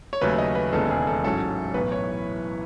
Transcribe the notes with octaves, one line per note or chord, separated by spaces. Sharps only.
C#5
D#2 C#3 F#3 A3 C#4 B4
D#5
B4
E1 D#2 C#3 G#3 B3 A4
G#4
A4
A1 G#2 F#3 C#4 A4
B1 A2 E3 B3 B4
C#5